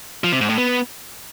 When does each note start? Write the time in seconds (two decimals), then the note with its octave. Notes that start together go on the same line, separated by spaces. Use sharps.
0.24 F3
0.32 C3
0.41 G#2
0.49 A2
0.58 B3